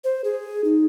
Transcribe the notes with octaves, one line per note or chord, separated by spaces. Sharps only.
C5
G#4
D#4